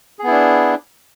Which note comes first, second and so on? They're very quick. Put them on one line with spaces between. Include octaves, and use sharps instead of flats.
G#4 B3 E4 D4